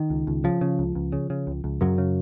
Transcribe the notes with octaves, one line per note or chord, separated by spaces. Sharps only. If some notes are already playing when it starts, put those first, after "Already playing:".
Already playing: D#3
C#2
C#2
C#3 F3
C#3
C#2
C#2
C#3
C#3
C#2
C#2
F#2 C#3 F#3
C#3